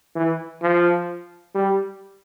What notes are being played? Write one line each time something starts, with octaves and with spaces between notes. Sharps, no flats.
E3
F3
G3